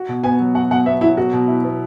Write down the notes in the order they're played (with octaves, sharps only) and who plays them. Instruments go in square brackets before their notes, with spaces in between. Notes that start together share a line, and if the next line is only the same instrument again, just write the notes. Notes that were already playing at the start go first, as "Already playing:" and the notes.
Already playing: [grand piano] F#4
B2
[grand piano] B3 [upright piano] G#5
[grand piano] F#3
[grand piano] F#4 [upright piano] F#5
[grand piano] B2 [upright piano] F#5
[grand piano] B3 [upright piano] E5
[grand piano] F#3 [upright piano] E4
[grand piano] B2 [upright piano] F#4
[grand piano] B2
E4
B3